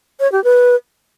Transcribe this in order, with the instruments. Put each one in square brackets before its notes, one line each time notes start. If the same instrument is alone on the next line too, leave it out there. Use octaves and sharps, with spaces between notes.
[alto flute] C#5
G4
B4